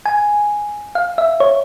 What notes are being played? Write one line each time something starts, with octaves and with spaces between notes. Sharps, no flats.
G#5
F5
E5
C#5